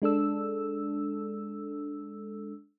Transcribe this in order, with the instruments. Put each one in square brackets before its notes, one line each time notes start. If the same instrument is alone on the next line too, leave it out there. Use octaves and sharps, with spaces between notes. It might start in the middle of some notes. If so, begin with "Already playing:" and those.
[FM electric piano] G#3 D4 A4 E6